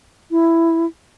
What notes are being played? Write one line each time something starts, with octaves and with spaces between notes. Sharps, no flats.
E4